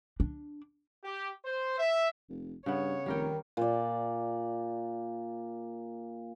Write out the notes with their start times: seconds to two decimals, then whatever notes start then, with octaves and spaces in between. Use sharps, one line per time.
0.20 D4
1.02 G4
1.44 C5
1.78 E5
2.30 F1
2.66 G2 C#3 B3 C#5
3.06 F1 D#3 G3 A#4 G5
3.57 A#2 D5